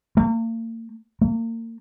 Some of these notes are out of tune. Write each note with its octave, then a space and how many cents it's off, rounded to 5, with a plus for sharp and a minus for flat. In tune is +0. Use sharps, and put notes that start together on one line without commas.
A#3 -40
A#3 -35